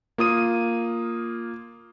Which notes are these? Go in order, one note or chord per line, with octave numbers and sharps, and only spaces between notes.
A#3 F4 D#6 D#7